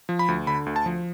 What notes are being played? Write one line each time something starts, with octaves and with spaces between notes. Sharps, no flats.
F3
B5
D2
D3 B5
D2
A5
F3